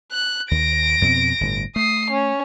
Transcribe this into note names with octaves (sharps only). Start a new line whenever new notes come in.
F#6
D#2 A#6 D7
F2 B2 C4
G1 A2
A3 D#6 C7
C#4